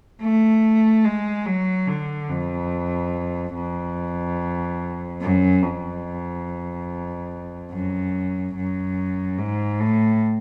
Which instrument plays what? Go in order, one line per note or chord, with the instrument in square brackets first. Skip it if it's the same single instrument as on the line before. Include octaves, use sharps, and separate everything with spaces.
[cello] A3
G#3
F#3
D3
F2
F2
F#2
F2
F#2
F#2
G#2
A2